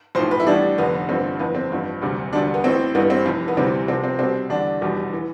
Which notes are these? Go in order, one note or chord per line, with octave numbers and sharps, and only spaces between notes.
B1 A2 F3 C5
B4
E4
A1 A2 G3 D4
F1 F2 D3 B3
A1 G2 D3 F3 C4
G1 F2 E3 B3
C4
A1 G2 F3
E1 D2 C3 G3
E1 D2 D3 G3 D4
B3
A1 A2 E3 C4
A1 G2 E3 G3 B3
C4
F1 F2 E3
B3
D2 C3 E3 G3 C4
C2 C3 F3 C4
C4
C2 B2 G3 C4
E2 D3 G3 D4
F1 E2 B2 G3
E3